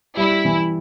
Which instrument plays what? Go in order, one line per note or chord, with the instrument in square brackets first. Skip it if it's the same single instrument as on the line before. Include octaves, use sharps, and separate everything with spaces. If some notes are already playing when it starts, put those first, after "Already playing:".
[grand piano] G3 [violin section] E4
[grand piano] E3